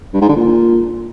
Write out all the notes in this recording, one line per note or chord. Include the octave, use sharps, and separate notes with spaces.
G2
G#2
D3
A#2